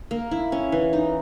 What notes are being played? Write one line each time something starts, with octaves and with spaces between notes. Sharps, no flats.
A#3
E4
C#4
E3
D#4